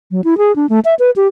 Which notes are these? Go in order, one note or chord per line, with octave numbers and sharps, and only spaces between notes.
F#3
E4
G#4
D4
A3
E5
B4
G4